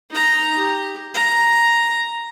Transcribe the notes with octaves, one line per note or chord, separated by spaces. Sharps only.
D#4 A#5
G4
A#5